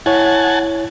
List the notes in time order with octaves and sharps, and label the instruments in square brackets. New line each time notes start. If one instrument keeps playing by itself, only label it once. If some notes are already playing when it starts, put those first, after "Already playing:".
[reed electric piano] E4 C#5 [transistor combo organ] F#5 G#5 A5